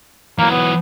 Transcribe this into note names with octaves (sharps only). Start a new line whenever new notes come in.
E3 F#3 A#3
B3